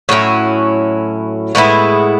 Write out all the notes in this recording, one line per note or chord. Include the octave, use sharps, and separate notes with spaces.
A2 F#3 C#4 E4
A2 G#3 B3 E4